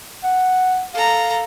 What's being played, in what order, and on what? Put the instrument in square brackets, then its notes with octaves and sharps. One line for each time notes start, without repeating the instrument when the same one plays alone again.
[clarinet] F#5
[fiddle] A4 A#5 [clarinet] F5